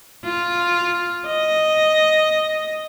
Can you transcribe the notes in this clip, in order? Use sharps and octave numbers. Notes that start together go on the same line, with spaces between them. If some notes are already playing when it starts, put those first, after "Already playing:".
F4
D#5